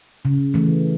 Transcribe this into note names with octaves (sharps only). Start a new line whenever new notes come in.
C#3
E3 A3